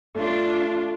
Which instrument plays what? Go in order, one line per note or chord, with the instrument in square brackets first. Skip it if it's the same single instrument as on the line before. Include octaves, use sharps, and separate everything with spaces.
[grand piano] A3 [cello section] D4 F4